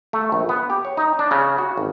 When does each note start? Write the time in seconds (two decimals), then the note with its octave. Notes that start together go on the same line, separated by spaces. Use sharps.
0.13 A3
0.32 A#1
0.49 B3
0.70 G4
0.85 C#5
0.97 D#4
1.19 D4
1.31 C#3
1.58 F#4
1.77 G#1